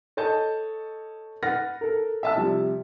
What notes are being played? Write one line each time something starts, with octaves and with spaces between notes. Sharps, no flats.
A4 C#5 D#5 A5 G6
B4 F#5 F6 A6 A#6
A4 A#4
E5 A5 E6
C3 F3 G3